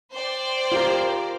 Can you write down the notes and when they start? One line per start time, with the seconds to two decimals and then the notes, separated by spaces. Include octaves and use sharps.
0.13 C5 D5 G5
0.72 F4 G4 A#4